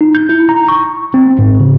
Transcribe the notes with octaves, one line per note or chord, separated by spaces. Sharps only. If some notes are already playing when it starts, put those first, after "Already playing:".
D#4
G6
E4
A#5
C#6
C4
G#2
C#3